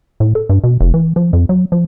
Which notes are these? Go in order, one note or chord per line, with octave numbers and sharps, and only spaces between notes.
A2
A4
G2
B2
F1
E3
F3
F2
F#3
F3